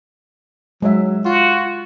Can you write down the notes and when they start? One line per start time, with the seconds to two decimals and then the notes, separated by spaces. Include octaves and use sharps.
0.82 F#3 G#3 E5
1.25 F4 F#4